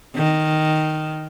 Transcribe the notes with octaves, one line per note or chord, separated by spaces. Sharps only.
D#3